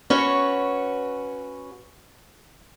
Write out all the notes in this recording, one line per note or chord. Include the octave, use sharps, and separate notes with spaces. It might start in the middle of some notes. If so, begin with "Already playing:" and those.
C#4 F#4 B4 C#5